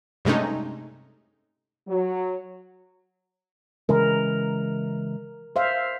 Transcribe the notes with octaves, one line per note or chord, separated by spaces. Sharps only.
G2 C3 G#3 A3 C#4 D#4
F#3
C#3 E3 G#3 A#4
C5 E5 F5